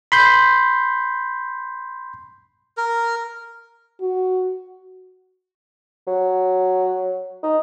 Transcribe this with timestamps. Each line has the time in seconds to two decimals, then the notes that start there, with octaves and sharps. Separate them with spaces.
0.12 B5 C6 G6
2.77 A#4
4.01 F#4
6.07 F#3
7.43 D#4